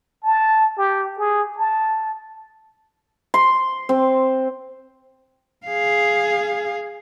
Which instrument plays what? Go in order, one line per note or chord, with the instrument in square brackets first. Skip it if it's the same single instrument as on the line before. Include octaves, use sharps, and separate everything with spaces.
[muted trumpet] A5
G4
G#4
A5
[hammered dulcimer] C6
C4
[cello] G#4 F5